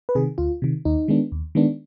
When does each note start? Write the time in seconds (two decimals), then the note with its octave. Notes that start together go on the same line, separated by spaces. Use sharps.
0.09 B4
0.15 C3 D#3 G#4
0.38 D2 F4
0.62 C3 D#3
0.85 D#2 D#4
1.08 D#3 G#3 B3 D4
1.32 D#2
1.55 D#3 G#3 B3 D4